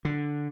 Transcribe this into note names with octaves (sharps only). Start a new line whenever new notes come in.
D3